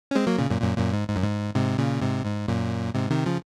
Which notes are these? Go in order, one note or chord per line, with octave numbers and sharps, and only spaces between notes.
C#4
G#3 C4
F#3 A#3
A#2 C#3
F#2 A#2
F#2 A#2
F#2 A#2
G#2
G#2
F#2
G#2
G#2 C3
A#2 C#3
G#2 C3
G#2
F#2 A#2
G#2 C3
C3 D#3
C#3 F3